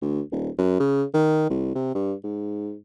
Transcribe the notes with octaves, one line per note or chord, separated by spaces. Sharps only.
D2
D#1
F#2
C#3
D#3
C2
C3
G2
G#2